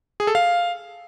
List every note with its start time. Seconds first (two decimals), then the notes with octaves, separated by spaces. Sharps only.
0.20 G#4
0.27 A4
0.35 F5